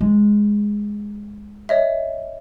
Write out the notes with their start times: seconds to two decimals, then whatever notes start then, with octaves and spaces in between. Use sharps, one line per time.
0.01 G#3
1.69 C#5 D#5 E5